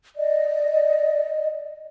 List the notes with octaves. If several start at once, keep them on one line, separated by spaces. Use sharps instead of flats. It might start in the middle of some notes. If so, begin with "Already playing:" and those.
D5 D#5